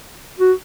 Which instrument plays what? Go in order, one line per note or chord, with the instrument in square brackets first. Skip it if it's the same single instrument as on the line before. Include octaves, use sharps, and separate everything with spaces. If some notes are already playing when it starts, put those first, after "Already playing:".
[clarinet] F#4